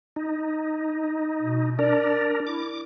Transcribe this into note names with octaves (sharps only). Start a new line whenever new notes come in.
D#4
B2
D4 A#4 D5
E4 D6